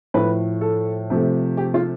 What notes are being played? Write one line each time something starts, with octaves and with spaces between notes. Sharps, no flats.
A2 F3 A3 B4
A4
C3 F3 A3
G4
F4